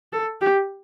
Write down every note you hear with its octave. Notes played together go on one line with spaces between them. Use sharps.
A4
G4